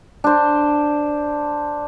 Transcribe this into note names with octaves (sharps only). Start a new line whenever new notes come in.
D4 C5